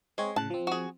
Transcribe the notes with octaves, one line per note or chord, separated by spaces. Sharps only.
G#3 C4 G#4 C#5
A2 C#3 A5 F#6
F3 C4
F#4 G#4